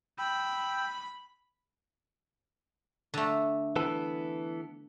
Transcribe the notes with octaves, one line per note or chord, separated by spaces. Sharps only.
G5 B5 E6
D3 A3
E3 B3 A4